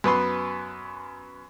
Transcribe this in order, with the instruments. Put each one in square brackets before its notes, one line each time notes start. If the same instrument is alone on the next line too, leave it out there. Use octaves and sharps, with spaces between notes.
[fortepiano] F#2 B3 B4 C6